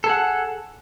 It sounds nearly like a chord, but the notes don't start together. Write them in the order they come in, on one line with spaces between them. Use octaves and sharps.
A4 G#4 F#5